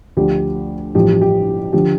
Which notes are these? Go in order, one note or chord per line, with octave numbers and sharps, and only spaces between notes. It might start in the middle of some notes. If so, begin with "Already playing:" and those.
D2 D3 F3 G4
A1 G2 F3 G4
G4
G4
D3 F3 G4